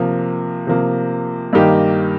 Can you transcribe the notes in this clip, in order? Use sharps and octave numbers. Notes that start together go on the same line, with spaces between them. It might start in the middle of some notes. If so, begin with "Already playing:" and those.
Already playing: C3 F3 A#3
C3 F3 A#3
G2 D#3 A#3 D#4 G4